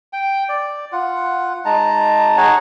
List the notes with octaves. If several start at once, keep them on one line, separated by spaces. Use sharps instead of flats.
G5
D5
F4 F#5
G#3 D#4 A5 A#5
D#4 G#4 C#5 F#5